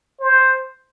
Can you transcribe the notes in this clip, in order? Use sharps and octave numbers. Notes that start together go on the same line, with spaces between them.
C5